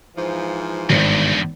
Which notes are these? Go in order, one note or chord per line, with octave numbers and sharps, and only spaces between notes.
G#2 E3 F3
G#1 E2 G2